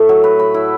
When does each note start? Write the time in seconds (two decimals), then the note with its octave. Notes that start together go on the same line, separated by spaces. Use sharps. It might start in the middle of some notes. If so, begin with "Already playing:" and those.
Already playing: A2 A3
0.09 F#3
0.24 B4
0.39 B4
0.54 E4